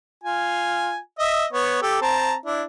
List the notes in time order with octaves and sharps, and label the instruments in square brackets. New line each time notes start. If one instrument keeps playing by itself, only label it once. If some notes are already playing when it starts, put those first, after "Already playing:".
[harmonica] F4 G#5
D#5 E5
B3 C#5
G4 A4
C4 A5 A#5
D4 E4